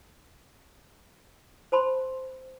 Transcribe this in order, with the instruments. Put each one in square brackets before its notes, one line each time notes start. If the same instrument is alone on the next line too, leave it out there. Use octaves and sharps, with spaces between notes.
[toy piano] C5 A5 B5 C6